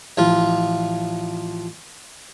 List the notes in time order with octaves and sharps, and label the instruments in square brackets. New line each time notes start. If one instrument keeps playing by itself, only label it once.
[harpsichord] A1 F3 F4